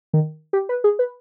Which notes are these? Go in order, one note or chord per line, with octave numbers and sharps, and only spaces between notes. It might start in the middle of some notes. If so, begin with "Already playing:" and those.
D#3
G4
B4
G#4
B4